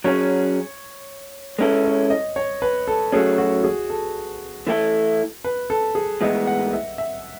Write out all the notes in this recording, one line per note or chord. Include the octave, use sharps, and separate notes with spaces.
F#3 C#4 G#4 C#5
G#3 C#4 E4 A4 B4
C#5
D#5
C#5
B4
A4
F#3 A3 C#4 G#4
F#4
G#4
A4
E3 A3 E4 A4
B4
A4
G#4
A2 E3 G#3 B3 D#5
F#5
E5
E5